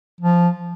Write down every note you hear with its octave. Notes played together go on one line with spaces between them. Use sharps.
F3